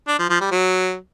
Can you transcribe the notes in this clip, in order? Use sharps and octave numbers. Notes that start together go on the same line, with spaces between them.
D4
F3
F3
G3
F#3